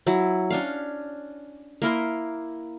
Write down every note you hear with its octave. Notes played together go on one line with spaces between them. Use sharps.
F#3 E4
C#4 D4 F5
A#3 E4 A#4 C6